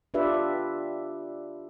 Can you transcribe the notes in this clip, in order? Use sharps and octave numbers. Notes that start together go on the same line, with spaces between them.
D4 F4 G4 B4 D5 E5